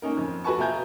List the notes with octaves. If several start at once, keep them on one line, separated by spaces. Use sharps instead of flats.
A#3 C#4 D#4 A#4
F2
F#4 A4 B4 G#5 A5 C#6
B2 F4 E5 G#5 A#5 G6